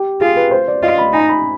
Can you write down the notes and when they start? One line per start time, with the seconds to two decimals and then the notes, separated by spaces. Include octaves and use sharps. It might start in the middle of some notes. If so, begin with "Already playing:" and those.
Already playing: G4
0.21 F4 G#4
0.36 B4
0.51 C5
0.68 D5
0.83 F4 D#5
0.98 B5
1.13 D#4 G#5
1.29 B5